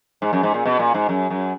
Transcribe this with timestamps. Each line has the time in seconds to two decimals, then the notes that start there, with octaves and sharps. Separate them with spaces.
0.22 G#2
0.33 F#2
0.43 G#2
0.54 A#2
0.65 B2
0.79 A#2
0.94 G#2
1.09 F#2
1.30 F#2